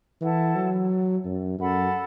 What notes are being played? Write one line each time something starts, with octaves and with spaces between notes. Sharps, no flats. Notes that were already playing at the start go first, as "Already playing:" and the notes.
E3 E4 A4 F#5 A5
F#3
F#2
F#2 A4 F#5 B5